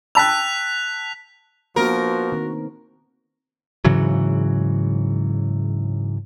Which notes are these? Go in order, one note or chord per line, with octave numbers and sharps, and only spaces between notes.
G5 A5 E6 F#6 B6 F7
F3 A#3 B3 D4 F#4 A#4
D#3 C4
G#2 C#3 E3 F#3